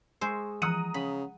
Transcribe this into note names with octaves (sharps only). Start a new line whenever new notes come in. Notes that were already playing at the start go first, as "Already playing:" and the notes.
G#3 C5 C#6 D#6 E6
E3 F3 F#5 A#5 D#6 D#7
C#3 F#5 B5